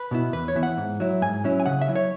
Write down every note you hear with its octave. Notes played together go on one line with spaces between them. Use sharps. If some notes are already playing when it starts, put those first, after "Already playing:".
Already playing: B4
B2 B3 E4
E2 B4
C#5
E3 B3 E4
F#5
G#2
F#3 E4
G#2 G#5
F#3 C#4 E4
G#5
C#3 F#5
E5
F#3 E4
C#5